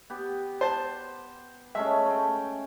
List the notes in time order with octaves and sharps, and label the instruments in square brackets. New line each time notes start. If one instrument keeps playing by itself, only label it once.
[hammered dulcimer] B3 G4
[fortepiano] C5 A5
[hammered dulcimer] G#3 A3 C#4 [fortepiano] E5
[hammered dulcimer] A3 G5